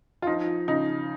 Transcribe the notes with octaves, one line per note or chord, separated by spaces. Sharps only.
F4
F3 D#4
C#3 D#4